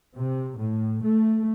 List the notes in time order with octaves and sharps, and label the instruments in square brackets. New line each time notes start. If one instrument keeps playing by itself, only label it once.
[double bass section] C3
A2
A3